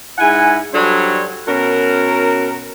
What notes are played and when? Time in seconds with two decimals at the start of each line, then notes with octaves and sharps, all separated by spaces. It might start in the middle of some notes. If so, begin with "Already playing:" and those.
0.18 G#2 E4 F#5 G#5
0.74 F#3 G3 D4 A4 C5 C#5
1.48 B2 C#4 F#4 A#4